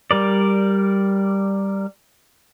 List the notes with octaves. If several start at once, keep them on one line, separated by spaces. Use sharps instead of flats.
G3 A#4 D5